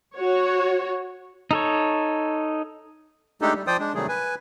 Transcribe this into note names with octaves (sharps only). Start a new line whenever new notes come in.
F#4 C#5
D#4 A4 C#5
G#3 A3 D4 D#4 G4 A4
G3
F3 C5 D5 G5 D#6
G#3 D4
C3 D#3 F#3 G3 A3 G#4
B4 G#5